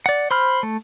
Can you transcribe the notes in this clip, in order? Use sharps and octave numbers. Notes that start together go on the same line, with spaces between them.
D5 F#5
C5 B5 F6
A3